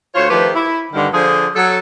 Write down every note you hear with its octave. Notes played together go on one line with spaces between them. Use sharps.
D2 F4 C5 C#5
D#3 F3 A3 G4 B4 C5
E4
G2 D3 D#3
D3 F3 F4 G#4 C5
F#3 A4